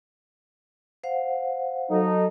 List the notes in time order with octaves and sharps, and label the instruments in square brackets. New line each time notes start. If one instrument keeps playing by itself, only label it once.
[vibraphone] C5 F5 F#5
[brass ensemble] F#3 D#4 A4